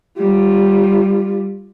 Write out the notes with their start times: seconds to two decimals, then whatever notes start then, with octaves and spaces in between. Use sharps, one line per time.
0.18 G3 F4